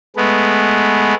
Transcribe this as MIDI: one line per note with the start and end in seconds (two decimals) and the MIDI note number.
0.16 1.14 56
0.16 1.14 57
0.16 1.14 59